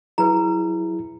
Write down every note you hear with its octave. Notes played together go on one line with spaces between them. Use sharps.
F#3 E4 G#4 B4 A#5